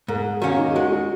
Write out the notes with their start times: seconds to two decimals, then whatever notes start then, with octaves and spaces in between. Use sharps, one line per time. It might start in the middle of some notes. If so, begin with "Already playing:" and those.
0.08 G#2 A#4
0.26 G#4
0.42 D#3 A#3 C#4 F#4
0.58 D#4
0.70 G#4
0.75 G#3 F#4
0.92 F#4